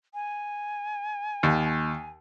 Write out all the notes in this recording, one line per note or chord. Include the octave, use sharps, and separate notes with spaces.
G#5
D#2